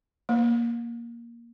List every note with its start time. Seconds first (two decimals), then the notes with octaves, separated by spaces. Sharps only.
0.29 A#3